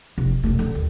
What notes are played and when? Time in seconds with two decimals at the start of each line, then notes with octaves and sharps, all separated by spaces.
0.18 F1
0.31 C3
0.43 E1 A3
0.59 D3 C#4
0.75 D#2